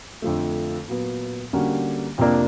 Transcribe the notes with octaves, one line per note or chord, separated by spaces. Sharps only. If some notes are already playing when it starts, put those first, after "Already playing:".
F2 D3 F3 A3
A#2 F#3 B3
D3 G3 A#3 C#4 F#4
F2 C3 F3 A#3 D4